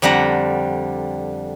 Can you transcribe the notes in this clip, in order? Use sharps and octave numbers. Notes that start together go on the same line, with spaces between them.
F2 D3 G3 F#5 A#5